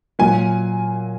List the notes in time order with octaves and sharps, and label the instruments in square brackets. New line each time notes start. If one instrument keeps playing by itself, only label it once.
[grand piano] A#2 F#3 A#3 G#5